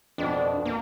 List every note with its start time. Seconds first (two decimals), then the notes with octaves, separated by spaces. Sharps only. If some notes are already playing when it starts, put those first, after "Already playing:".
0.18 F2 B2 D4
0.65 A#3